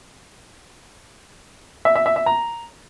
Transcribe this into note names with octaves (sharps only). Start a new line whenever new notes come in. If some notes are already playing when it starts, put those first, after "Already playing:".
E5
E5
E5
E5
A#5